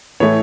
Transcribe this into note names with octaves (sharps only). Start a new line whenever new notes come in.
A2 E3 A3 E4 C#5